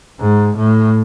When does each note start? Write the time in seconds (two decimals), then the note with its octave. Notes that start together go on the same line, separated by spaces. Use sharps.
0.20 G#2
0.57 A2